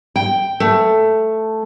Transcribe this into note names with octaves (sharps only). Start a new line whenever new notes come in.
G5
A3